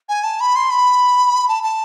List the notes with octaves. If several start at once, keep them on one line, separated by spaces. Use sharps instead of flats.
G#5
A5
B5
C6
B5
A5
A5